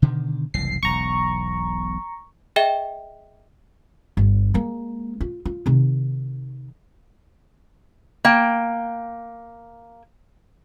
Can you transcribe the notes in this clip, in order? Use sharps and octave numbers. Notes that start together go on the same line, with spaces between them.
B2 D3 D#3
F#1 C2 E3 C7
E1 B1 A#5 C#6
G#4 D#5 E5 G5 G7
G1
G#3 A#3
F4
F4
C3 D#3
A#3 G5